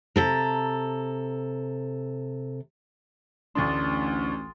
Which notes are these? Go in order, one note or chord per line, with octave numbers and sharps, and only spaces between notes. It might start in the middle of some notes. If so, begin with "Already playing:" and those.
C3 A4 A#5
A1 D2 D4 C6 D#6 A6